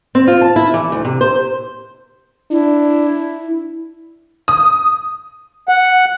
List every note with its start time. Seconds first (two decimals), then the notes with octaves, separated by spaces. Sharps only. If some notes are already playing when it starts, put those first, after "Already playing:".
0.15 C4
0.28 F4
0.41 A5
0.56 E4
0.74 E3
0.92 D2
1.05 C3
1.21 C5
2.51 D4 E4
4.48 D#6
5.69 F#5